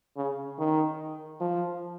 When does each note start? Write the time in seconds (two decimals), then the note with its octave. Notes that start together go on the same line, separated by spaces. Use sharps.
0.17 C#3
0.59 D#3
1.40 F3